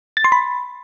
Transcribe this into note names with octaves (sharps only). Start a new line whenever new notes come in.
A6
C6
B5